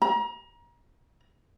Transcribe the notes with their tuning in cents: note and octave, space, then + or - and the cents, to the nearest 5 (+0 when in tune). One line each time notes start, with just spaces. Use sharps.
A#5 +30